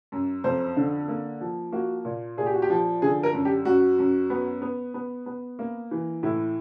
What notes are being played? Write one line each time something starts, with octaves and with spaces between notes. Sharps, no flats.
F#2
F2 C5
D3
A#3
F3
A#3 F#4
A#2
A#2 G#4
G4
F#4
G4
F3
D3 G#4
A#4
F#2
G4
F#2 F#4
F#2
B3
B3
B3
B3
A#3
E3
A2 E4